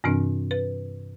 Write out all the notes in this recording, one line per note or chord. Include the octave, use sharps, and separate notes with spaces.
G2 C3 E3 C4 D4
B4